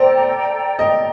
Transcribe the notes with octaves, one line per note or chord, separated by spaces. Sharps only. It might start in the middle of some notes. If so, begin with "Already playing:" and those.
Already playing: A4 C5 D5 G5 A#5
D#5